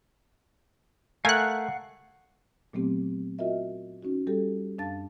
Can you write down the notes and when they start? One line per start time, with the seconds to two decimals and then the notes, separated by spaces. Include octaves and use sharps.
1.25 A3 A#4 F5 F#5 G#5 F#6
2.73 A#2 F#3 A3 B3 C4 G4
3.39 F4 F#4 A#4 D#5 E5
4.03 C#4 D#4 F#4
4.27 G3 G4 A4
4.78 F#2 D4 F5 A5 A6